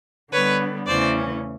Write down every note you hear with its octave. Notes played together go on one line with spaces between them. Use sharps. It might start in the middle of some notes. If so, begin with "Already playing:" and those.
D3 G3 B3 B4 C#5
E2 C#3 E3 A3 C#4 C5 D5